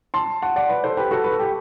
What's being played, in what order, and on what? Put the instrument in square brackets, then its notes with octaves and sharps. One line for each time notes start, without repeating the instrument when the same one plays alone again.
[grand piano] A5 C6
F#5 A5
D5 F#5
B4 D5
A4 C5
G4 B4
F#4 A4
B4
A4
G4